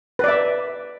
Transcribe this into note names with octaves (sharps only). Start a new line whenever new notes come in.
B4 D5 E5